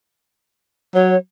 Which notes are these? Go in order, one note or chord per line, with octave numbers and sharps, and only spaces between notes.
F#3 C#5